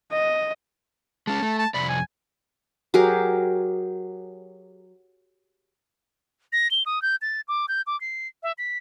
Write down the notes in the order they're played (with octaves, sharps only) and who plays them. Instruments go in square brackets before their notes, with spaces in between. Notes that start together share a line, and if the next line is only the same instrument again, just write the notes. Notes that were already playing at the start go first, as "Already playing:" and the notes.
[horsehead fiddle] D#5
[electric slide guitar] G#3 C#4 [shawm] A5
[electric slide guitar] A3
[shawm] A5
[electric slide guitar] F2 C3 D5 [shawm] B5
[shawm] G#5
[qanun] F#3 G4 G#4 A#4
[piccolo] A#6
G7
D#6
G6
A6
D6
G6
D6
C7
E5
B6